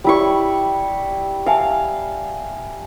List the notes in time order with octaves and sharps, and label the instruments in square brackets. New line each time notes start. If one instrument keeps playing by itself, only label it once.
[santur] G3 E4 C#6
[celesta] E5 G#5 A5 [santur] F5